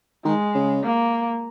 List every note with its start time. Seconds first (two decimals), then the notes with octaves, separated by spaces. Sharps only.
0.25 D#3 G#3
0.55 C#3
0.84 A#3